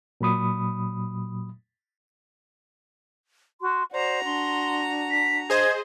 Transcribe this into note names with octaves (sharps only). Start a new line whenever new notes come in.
A#2 F#3 B5 D#6
F#4 C6
F#4 C5 D5 A#5
D4 C6
B6
G#4 C5 D#5 G#6